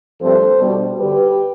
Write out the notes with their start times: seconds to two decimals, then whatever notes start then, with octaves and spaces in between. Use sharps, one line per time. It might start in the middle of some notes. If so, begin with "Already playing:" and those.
0.20 G2 F3 A3 C4 A4 C5
0.60 B2 G3 D4
1.00 G2 D3 G3 G4 B4